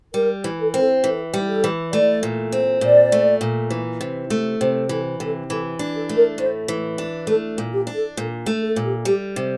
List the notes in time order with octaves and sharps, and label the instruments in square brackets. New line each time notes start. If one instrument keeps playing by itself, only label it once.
[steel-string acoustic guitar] G3 [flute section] A#4
[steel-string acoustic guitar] E3
[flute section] A4
[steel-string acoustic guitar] C4 [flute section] A#4
[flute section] A4
[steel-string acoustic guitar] E3 [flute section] A4
[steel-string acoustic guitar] G3
[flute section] A4
[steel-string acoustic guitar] E3
[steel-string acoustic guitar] A3 [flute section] D5
[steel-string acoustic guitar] A#2
C4
[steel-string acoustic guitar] A#2 [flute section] D5
[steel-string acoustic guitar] A3
A#2
E3
C3
A3
[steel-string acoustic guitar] C3 [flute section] C5
[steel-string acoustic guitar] E3 [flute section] A4
[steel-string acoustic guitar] C3 [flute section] A4
[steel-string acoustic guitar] E3 [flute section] A4
[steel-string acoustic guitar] D4
[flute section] A4
[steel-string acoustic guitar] A3
[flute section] A#4
[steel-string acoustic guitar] A2 [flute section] C5
[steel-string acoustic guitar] E3
D4
[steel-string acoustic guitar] A3 [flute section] A4
[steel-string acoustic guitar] A#2
[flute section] G4
[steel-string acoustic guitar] D4
[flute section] A4
[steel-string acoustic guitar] A#2 [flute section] A4
[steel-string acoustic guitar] A3
[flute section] A4
[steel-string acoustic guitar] A#2
[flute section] G4
[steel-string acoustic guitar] G3 [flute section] G4
[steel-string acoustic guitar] C3